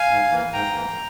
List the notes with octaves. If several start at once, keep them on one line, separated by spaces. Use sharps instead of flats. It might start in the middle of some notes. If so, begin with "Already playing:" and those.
Already playing: F5 G#5
G#2
E3 A#3
G#2 G5 A#5
E3 A#3